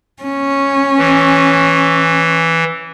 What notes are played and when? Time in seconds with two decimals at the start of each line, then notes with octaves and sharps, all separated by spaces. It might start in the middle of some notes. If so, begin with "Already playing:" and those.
0.22 C#4
0.98 E3